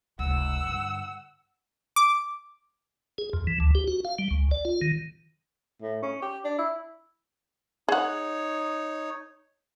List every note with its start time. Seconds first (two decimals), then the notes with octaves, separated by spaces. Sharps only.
0.19 F1 C#2 F#5 E6
0.64 G2 D3
1.96 D6
3.18 G#4
3.33 F2
3.47 E3
3.60 D2
3.75 G4
3.88 F#4
4.05 F5
4.19 G3
4.31 C#2
4.51 D5
4.65 F4
4.82 D#3
5.82 A2
6.02 C#4
6.22 G4
6.45 D4
6.58 E4
7.89 D#4 G#4 C#5 F#5